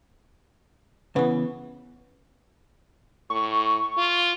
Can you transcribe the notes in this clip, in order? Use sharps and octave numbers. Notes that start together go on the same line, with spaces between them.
C#3 E3 B3
A2 C#6
F4